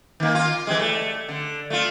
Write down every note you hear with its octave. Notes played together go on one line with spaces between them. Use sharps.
D#3 A#3
F4
E3 G3 G#3
A3
D3
A3 F4